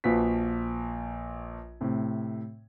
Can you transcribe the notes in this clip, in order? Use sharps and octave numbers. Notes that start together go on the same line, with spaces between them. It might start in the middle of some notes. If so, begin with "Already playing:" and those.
A#1 F3 F#4 B4 B6
A2 C3